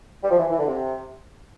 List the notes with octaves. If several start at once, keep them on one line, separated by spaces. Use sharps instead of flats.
G3
F3
E3
E3
D3
C3